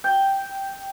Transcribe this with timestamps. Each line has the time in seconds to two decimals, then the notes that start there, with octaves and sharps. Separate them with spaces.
0.04 G5